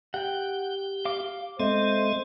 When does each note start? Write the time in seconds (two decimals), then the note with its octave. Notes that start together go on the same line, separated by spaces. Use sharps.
0.14 G4 F#5 G5
1.05 F5 D6
1.60 G#3 C4 A4 C5 D#5 E5